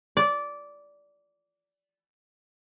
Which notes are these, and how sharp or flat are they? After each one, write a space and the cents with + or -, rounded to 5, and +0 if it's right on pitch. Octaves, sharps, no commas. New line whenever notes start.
D5 -15